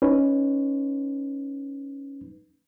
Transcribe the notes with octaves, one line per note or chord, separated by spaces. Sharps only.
C#4 D#4 B4